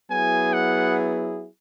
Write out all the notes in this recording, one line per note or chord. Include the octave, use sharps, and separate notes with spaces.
F#3 B3 E4 G#4 G#5
F#5